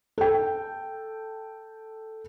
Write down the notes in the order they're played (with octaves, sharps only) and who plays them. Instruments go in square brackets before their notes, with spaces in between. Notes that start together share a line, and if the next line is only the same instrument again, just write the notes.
[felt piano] A4 G5